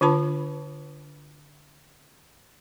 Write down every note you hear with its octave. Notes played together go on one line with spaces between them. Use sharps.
D3 D4 F4 B4 A5 B5